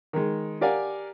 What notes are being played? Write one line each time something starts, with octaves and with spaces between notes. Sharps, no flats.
D#3 G#3
G4 A#4 D5 F5 F#5 G#5